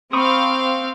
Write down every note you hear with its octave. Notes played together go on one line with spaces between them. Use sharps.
C4 F5 B5 C#6 D#6